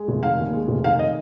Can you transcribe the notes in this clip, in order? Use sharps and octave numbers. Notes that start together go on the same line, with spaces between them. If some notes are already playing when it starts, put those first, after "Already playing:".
Already playing: G#3
F1
D#3 F5
D#2
G#3
F1
D#3 F5
D#5